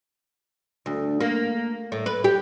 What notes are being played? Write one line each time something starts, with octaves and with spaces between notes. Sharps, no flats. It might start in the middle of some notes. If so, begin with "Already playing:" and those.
D2
A#3
A2
B4
G4